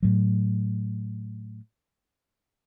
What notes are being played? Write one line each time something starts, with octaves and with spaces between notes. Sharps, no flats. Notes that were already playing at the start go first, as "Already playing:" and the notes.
A2 F#3